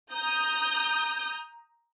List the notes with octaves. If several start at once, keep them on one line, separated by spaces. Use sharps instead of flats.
A#5 D#6 G6